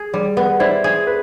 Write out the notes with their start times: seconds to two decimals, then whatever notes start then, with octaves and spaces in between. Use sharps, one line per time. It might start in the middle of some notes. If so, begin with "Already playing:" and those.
Already playing: G#4
0.14 G3
0.37 B3
0.60 E4 C5 D5
0.84 G#4
1.07 B4